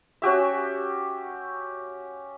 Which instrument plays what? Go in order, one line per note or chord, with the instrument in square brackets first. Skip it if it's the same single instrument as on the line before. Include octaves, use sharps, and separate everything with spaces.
[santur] C#4 F#4 G4 E5